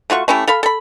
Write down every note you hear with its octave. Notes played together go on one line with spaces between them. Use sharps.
A3 F4 F#4 C#6
A3 C#4 E4 G4
A4 F5 B5
A4 B5